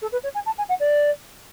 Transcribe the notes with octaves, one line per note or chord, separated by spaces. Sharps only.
A4
B4
C#5
G#5
A5
G#5
F#5
D5